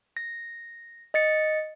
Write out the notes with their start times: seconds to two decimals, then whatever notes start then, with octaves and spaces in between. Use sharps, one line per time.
0.17 A#6
1.14 D#5 A6 C#7